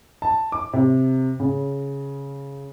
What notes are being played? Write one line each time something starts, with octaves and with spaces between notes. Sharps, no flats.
A5
D6
C3
C#3